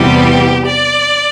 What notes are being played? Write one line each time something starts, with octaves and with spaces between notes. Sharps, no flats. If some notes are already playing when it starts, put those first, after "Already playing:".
Already playing: E2 C3 E3 G3 B3 G4
D5